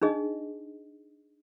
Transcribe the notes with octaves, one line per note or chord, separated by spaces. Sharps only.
D4 D#4 G#4 D#5